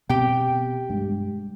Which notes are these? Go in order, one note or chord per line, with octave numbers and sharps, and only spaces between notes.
B2 B3 C4 G4 G5
G2 G#3